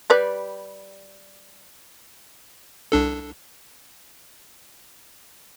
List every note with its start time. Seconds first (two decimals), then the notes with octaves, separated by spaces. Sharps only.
0.10 G3 B4 D5
2.92 C2 D4 A4